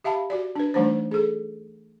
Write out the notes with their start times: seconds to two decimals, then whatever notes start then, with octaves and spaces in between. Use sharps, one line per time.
0.04 G4 E5 F5 A5 B5
0.30 F#4 D5
0.56 D4 B4
0.74 E3 G3 A3 D4 D#4 C5
1.11 G#4 A4